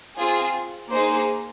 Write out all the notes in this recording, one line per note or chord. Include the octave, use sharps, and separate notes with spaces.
C4 F4 G#4
A#3 D#4 G#4 C5